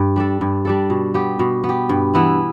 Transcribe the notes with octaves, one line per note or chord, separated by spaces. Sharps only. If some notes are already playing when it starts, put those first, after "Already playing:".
Already playing: G2
G3 D4 A4
G2
G3 D4 A4
B2
B3 G4
B2
B3
G4
G2
E3 B3 E4